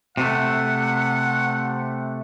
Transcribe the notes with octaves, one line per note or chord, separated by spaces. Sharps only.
C3 A3 F#5